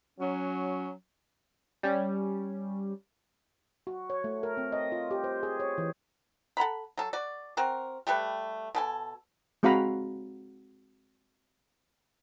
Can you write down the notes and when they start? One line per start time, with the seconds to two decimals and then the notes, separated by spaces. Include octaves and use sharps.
0.18 F#3 C#4
1.83 G3 C#4
3.87 F#4
4.10 C#5
4.24 A3
4.43 A#4
4.57 C4
4.72 D#5
4.92 F4
5.11 G4
5.24 C5
5.43 G#4
5.60 C#5
5.78 E3
6.57 A4 F#5 A#5 B5
6.98 F#3 A4
7.13 F#4 D5
7.57 C4 F#4 A#4
8.07 G3 A3 G4 B4
8.75 B2 A4 G#5
9.63 G#3 C4 F#4 F5 A#5 B5